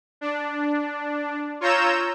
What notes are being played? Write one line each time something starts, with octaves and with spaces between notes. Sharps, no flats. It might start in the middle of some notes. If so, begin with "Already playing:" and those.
D4
F4 C#5 A#5 E6 G6 E7